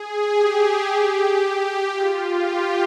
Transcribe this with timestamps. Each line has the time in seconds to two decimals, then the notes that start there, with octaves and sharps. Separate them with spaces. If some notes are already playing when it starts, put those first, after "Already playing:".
Already playing: G#4
0.33 G4
1.92 F4
2.45 G4